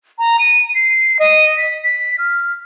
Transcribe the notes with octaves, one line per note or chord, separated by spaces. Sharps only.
A#5
D#7
C7
D#5
B6
B6
F6